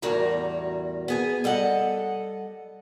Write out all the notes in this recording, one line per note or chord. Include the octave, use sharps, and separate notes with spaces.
E2 A2 G3 F#4 A#4 A#5
B3 G#4 G#5
G3 A4 D#5 F#5